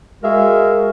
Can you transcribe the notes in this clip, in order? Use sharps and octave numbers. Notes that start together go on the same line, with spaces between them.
G#3 F#4 G#4 A#4 E5 F5